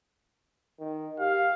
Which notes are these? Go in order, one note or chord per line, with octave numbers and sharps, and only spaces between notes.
D#3
G4 F5